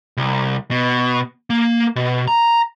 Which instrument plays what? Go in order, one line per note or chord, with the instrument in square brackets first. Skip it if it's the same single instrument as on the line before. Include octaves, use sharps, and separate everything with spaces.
[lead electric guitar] C2
B2
A#3
B2
A#5